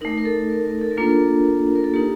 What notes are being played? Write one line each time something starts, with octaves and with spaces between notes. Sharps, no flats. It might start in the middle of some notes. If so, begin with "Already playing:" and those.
A3 D#4 A#4
A#4
A4
A#4
A#4
A4
A#4
A#3 D4 F4 A4
A#4
A4
A#3 D#4 G4